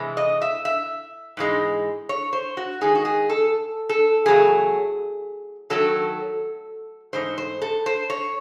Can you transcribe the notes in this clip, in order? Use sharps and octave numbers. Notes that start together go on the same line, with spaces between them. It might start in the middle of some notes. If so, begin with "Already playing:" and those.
Already playing: C3 E3 G#3
D#5
E5
E5
G#2 E3 G#3 D#4
C#5
C5
F#4
D#3 G#3 D#4 G#4
F#4
G#4
A4
A4
E2 C#3 F#3 A3 G#4
D#3 F#3 A3 A4
G#2 E3 A3 D#4 C5
C5
A4
C5
C#5